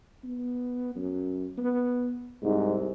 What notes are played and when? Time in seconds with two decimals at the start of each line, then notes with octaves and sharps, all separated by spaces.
0.24 B3
0.95 F#2
1.58 B3
2.43 C2 G#2